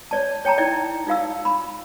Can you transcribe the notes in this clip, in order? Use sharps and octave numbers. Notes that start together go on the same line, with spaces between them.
C#5 D5 A5
C#5 G5 A5 A#5
D#4 E4 D5 G5
D#4 F4 F5 E6
B5